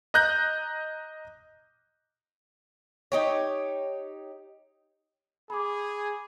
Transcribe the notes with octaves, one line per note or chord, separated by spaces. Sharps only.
D#5 A#5 F#6 G6 A#6
D#4 G4 C#5
G#4 B5 D6